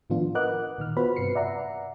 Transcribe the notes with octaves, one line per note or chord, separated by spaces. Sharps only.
A2 D#3 F3 B3 D4 F4
A#4 B4 D#5 F#5 D6 F#6
A#2 D#3 F6
B3 F4 F#4 B4 C5 B5
G2 C3 B4 C7 C#7
D5 E5 F#5 A#5